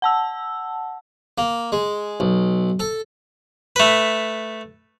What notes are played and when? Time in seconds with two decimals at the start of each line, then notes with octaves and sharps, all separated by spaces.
0.02 F#5 A5 E6
1.38 A#3
1.72 G#3
2.20 B1
2.80 A4
3.76 A3 B4